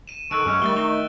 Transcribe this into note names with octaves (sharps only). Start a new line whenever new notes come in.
D#7 E7
D#3 A4 C#6 E6 F#6 D7
F#2 G#3 C#4
D#3 G3 A3 A6 G7
D#4 G7